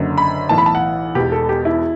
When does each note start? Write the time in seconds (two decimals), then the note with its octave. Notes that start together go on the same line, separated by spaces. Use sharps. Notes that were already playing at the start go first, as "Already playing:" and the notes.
Already playing: F#1 F#2 D3
0.18 B5
0.49 B1 A2 E3 A5
0.58 B5
0.66 A5
0.75 F#5
1.15 E1 E2 B2 G4
1.32 A4
1.49 G4
1.65 E4